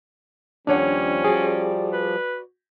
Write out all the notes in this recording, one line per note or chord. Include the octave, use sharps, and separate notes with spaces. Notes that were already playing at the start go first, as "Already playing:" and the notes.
D#2 F3 G3 C#4 D4 C#5 F#5
F#4 G#4 D5
B4